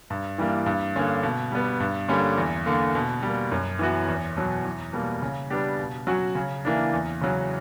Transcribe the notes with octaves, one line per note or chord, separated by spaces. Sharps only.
G2
E3 G3 A#3
G2
D3 A#3 C#4
B2
G3 B3
G2
D3 G3 A#3 C#4
E2
D3 A#3
B2
G3 A#3
F#2
E3 B3 F#4
E2
B2 F#3
E2
B2 G3 A#3
C#3
G3 B3 D4 G4
B2
F#3 C#4 F#4
C#3
E3 A#3 D4
E2
C#3 F#3